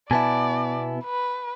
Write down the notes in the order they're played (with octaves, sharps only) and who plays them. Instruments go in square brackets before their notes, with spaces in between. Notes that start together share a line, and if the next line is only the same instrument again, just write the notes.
[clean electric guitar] B2 B3 E4 [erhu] D5 [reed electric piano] G#5 A5
[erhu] B4